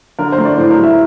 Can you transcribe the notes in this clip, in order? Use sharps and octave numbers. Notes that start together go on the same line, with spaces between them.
D3 A#4
C5
A3
D5
A2 C5
A#4
G3
E5